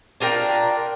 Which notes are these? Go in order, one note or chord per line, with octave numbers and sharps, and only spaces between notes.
D4 F4 A#4 G5